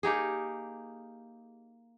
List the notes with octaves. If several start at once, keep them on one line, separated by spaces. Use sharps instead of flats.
A#3 D#4 G4 G#4